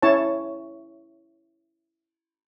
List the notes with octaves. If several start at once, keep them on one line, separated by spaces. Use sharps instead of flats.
C#4 E4 C#5 A5